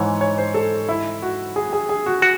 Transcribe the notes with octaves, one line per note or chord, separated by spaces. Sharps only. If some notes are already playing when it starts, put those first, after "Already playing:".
Already playing: G#2 E3 C#5
C#5
C5
A4
E4
F#4
G#4
G#4
G#4
F#4
F#4